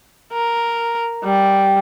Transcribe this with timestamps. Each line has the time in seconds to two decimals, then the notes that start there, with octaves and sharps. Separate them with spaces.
0.33 A#4
1.24 G3